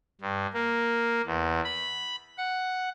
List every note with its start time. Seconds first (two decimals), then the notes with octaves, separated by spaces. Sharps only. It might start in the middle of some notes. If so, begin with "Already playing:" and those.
0.21 G2
0.53 A#3
1.26 E2
1.64 B5
2.38 F#5